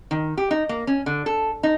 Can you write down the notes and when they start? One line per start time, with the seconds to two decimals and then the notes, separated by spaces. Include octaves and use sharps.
0.11 D#3
0.37 G4
0.51 D#4
0.69 A#3
0.87 C#4
1.06 D3
1.26 A4
1.63 D#4